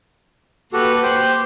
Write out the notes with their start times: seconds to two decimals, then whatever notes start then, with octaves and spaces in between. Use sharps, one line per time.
0.73 A#3 F#4 G4 A4 B4
1.03 G4 C5 G5